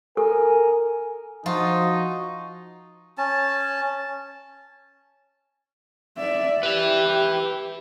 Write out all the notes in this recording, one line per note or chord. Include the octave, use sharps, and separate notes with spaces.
A4 A#4 G#5
F3 D#4 F4 F#4
C#4 A5
D5 E5
G4 B4 E5